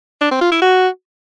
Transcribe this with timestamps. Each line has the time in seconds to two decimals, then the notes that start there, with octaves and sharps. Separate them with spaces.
0.21 D4
0.31 C4
0.41 F4
0.51 E4
0.61 F#4